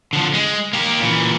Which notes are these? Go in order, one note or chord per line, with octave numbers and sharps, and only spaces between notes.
D3 F3
G#3
A#3 G4
A#2 E3